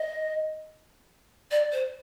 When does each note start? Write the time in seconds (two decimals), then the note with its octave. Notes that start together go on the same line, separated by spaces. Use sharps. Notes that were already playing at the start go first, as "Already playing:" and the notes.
Already playing: D#5
1.51 D5
1.72 C5